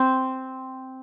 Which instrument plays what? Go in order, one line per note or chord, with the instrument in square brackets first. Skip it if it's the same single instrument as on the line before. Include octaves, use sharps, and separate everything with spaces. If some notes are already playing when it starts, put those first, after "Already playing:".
Already playing: [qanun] C4